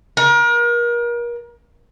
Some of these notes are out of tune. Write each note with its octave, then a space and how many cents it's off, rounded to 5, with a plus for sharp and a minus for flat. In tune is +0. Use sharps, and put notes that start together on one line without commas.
A#4 +35